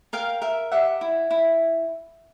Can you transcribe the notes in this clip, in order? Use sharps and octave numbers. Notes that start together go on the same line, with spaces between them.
A#4 F5 G5
A#4 E5
G4 E5 F#5
E4
E4